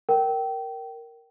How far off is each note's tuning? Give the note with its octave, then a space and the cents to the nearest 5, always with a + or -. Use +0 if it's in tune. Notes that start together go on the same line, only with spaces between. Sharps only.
A#4 +0 G5 -25